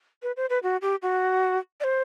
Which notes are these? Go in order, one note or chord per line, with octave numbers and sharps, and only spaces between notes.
B4
C5
B4
F#4
G4
F#4
D5
C5